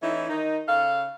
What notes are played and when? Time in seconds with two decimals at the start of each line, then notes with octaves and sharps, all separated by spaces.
0.02 E3 A3 C#4 D#4 E4
0.29 D#3 D#4
0.68 C#3 A4 F5